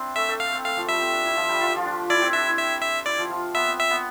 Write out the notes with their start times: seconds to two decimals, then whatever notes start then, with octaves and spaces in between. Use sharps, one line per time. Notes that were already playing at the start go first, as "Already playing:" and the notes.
Already playing: C4 D4 E4
0.16 A3 E5
0.29 A3
0.40 F5
0.53 C4
0.64 A3 F5
0.77 F3
0.84 G3 A3 E5
1.01 C4
1.13 D4
1.25 E4
1.37 F3 F4
1.49 G3 G4
1.61 F4
1.69 G4
1.76 F3 F4
1.85 D4
2.10 E4 D5
2.22 C4
2.33 D4 E5
2.46 E4
2.58 E5
2.82 E5
3.06 E4 D5
3.18 F3 F4
3.30 F3 F4
3.55 B3 E5
3.67 C4
3.79 E5
3.90 B3